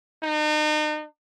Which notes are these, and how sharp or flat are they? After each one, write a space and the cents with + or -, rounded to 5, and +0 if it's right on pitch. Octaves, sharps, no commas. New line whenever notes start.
D#4 -40